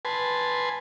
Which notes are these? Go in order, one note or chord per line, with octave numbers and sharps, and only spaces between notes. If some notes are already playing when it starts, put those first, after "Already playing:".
B4 G#5 A5 C6